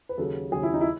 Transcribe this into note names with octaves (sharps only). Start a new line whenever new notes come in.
B4
D#2 C#3 F#3 A4
D#2 C#3 F#3 G#4
E4
D#4
E4